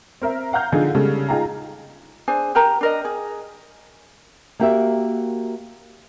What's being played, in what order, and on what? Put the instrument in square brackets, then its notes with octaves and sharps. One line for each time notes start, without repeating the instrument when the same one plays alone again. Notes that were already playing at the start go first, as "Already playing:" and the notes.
[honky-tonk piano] C4 A#4 E5
F5 F#5 A#5 F6 G6
D3 D#4 F4 G#4 A4
C#3 G3 G#3 A4
D#4 F4 G#4 G5 A5 A#5
[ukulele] D4 G#4 C5 G#5
G4 A#4 A#5
D4 A#4 D#5
G#4
[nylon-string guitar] A#3 F#4 G4 A#4 E5